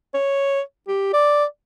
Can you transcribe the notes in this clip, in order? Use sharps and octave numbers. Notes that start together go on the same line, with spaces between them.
C#5
G4
D5